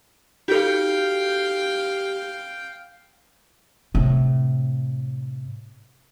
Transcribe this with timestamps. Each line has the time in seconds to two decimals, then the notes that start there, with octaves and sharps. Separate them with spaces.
0.48 D#4 F#4 G4 A4 F5 G5
3.95 A2 C3